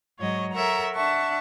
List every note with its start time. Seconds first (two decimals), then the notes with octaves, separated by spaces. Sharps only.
0.20 G#2 F#3 C#5 D#5
0.53 A4 A#4 C#5 E5 F#5 A#5
0.94 D4 E5 F#5 A5 C#6